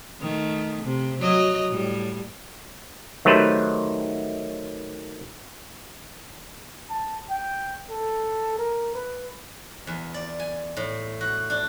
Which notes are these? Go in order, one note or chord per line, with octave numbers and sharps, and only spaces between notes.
D#3 A3
C3
F#3 D#5
A2 G3
D#3 F#3 A3 G4 B4 C5
A5
G5
A4
A#4
B4
E2
D5
G#5
A2
F#4
D4